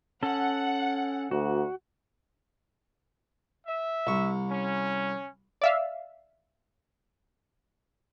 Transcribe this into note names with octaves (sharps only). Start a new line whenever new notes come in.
C#4 A4 F#5
D2 F#4
E5
C2 C#6
C#4
D5 E5 F5